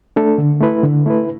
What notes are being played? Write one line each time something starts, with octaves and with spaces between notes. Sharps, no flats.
A3 D4 A4
D3
A3 E4 B4
D3
A3 E4 B4